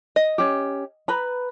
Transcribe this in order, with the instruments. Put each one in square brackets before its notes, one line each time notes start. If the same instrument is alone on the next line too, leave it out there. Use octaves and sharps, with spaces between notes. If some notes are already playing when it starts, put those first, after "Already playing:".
[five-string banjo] D#5
[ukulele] C#4 G4
B4 A#5 B5